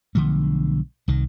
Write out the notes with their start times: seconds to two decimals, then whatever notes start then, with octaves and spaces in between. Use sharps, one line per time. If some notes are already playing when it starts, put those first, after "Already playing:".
0.15 B1 D3 F3 A3
1.08 C2 D#3